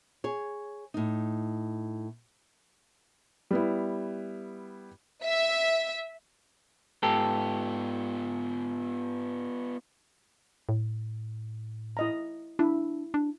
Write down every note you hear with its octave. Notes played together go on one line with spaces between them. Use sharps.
G#4 C#5
A2 D#4
G3 B3 E4
E5
G#2 B3 F4 G4 A4
A2
E4 D#5 A#5
D4 E4
D4